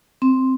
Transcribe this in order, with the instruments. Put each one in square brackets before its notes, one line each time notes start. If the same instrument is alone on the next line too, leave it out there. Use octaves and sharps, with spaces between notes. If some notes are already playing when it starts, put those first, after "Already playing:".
[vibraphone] C4